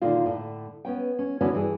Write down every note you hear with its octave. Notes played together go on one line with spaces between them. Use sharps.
A#2 D3 D#3 F4
A2 D3 A3
B3 C#4 G5
C#4
D3 E3 B3 C#4 D4 F#4
G2 E3 G#4